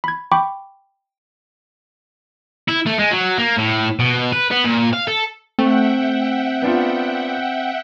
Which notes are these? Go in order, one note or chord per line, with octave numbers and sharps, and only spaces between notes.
B5 G#6
G5 B5 C#6 D6
E4
A3
G#3
F#3
A#3
A2
B2
B4
B3
A#2
F5
A4
A3 C4 E5 F#5 G5
B3 D4 F4